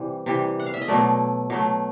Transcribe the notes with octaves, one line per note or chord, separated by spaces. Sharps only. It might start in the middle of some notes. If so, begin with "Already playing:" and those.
Already playing: C3 E3 G3
C3 E3 G3
F#5
F5
E5
D#5
B2 F#3 A3 D5
B2 F#3 A3